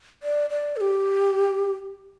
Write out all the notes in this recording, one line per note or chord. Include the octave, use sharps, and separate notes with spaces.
D5
D5
A4
G4